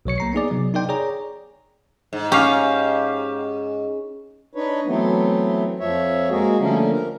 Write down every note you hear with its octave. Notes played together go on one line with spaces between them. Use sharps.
B1 F#3 C#5 C#7
A#3 A#5 C7
B3 D#4 G#4 D5
C3 F#3 B3
B3 D#4 A#4 D5 G5 C6
G#4 C#5 D5 A#5
G#2
C#4 G4 F5
D4 D#4 B4 C#5
E3 F#3 A3 B3 C4
F2 F3 C#5 E5
G#3 A#3 F#4 G#4
D3 F3 G3 A3 A#3 C#4
A#4